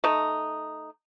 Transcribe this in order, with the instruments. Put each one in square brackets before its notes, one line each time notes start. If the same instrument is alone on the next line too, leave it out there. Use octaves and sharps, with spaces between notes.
[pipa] A3 D#4